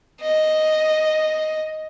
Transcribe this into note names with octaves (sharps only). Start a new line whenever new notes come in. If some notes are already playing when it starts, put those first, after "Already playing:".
D#5